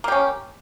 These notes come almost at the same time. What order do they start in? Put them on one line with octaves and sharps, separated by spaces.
A#3 G4 C#4